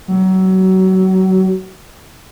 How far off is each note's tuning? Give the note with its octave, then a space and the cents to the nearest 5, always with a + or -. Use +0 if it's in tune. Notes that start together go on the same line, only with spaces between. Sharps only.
F#3 +25